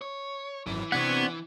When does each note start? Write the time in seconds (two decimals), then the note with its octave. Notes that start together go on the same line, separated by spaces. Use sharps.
0.01 C#5
0.67 G#1 F#2 E3
0.92 C3 B3 C4 D4 F#5 C#6 G#6